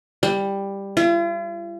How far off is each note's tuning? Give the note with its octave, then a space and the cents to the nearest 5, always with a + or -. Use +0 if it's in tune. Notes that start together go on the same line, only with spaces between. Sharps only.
G3 +10
F4 -45